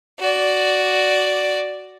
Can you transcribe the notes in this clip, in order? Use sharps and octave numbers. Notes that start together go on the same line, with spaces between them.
F#4 D5